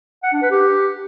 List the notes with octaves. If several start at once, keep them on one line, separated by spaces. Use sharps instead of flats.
F#5
D4
B4
G4